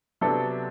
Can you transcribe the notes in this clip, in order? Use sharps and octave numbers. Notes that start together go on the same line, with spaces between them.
C3 F#3 B3 D4 A4